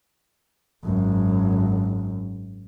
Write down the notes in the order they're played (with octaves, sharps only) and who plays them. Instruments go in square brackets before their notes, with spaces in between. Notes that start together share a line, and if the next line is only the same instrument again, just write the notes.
[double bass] G#1 F#2